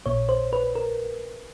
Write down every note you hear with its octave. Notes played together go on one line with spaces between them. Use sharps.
A#1 A#2 C#5
C5
B4
A#4